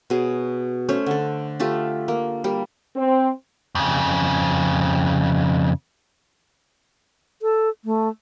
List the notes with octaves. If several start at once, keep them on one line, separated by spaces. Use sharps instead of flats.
B2 G#4 C#5
A3 C#4 C5 C#5
D3 A4
A3 F4 G4 A5
A#3
G3 A#3
C4
F2 C#3
A4
A3